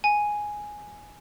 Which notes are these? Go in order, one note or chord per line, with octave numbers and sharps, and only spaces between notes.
G#5